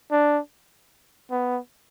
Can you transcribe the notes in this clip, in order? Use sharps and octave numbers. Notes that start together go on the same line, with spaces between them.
D4
B3